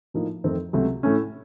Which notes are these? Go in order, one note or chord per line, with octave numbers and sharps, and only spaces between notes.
A2 F3 A#3 D#4
F2 D#3 A3 C4 D#4
C#2 C3 F#3 A3
A2 A3 C#4